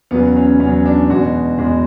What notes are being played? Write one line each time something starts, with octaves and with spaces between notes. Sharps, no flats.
E2 C#3 F#3 B3
C#4
E2 C#3 F#3 C#4
D4
E2 B2 G#3 F#4
E2 B2 G#3